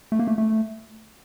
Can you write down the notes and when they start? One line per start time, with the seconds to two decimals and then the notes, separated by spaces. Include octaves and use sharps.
0.12 A3
0.19 A#3
0.27 A3
0.38 A3